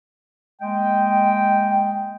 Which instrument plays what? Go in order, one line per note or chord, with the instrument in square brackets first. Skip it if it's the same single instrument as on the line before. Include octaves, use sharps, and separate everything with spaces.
[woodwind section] G#3 A#3 D#5 G5